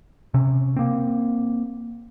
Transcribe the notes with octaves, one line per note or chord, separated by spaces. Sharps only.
C3 C#4
A#3 C4